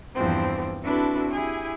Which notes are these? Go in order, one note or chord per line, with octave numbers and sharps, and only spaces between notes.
E2 G2 E3 F3 C4
C4 D4 E4 F#4 A4 B4
E4 G4 G#4 G#5